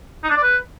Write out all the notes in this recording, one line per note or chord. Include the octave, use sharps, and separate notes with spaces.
D#4
D4
D5
B4